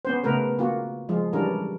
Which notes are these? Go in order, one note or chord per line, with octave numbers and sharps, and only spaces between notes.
B3 C#4 C5
C#3 A3 B3 A#4 B4
A#3 F4 F#4
F3 G#3 F4
E3 G3 C#4 D4 A#4